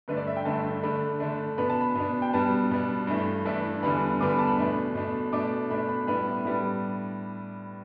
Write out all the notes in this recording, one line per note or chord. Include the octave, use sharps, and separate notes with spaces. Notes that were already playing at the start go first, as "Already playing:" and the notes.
G2 D3 A3 D4 B4
D5
E5
G5
G2 D3 A3 D4 A5
D3 A3 D4 B5
D3 A3 D4
B2 B3 D4 B5
A5
B5
B2 B3 D4
G5
B2 G3 B3 D4 A5
B2 G3 B3 D4
G2 E3 A3 D4
G2 E3 A3 D4 E5
E2 D3 G3 B3 D4 B5
E2 D3 G3 B3 D4 D6
B5
A5
B5
B2 A3 D4
B2 A3 D4
B2 A3 D4 D6
B2 A3 D4 B5
B5
A2 G3 B3 D4 B5
A2 G3 B3 D4